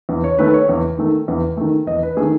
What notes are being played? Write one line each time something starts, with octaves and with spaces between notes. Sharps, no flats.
E2
C#5
D#3 A3 B4
C#5
E2
D#3 A3
E2
D#3 A3
E2 D#5
B4
D#3 A3 G#4